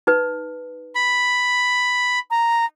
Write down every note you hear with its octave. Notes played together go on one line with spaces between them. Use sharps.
D#4 B4
B5
A#5